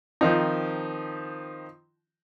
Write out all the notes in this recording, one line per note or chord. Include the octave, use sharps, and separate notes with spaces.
D#3 F3 C4 D#4